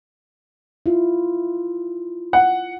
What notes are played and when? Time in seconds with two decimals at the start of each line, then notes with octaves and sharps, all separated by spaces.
0.86 E4 F4
2.33 F#5